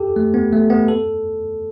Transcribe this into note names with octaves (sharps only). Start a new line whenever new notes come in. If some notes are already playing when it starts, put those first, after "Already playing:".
Already playing: G4 A4
A3
B3
A3
B3
A4